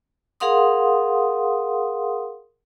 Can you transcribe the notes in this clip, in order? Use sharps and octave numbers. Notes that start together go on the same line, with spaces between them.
G#4 A#4 F5 F#5 C6 D#6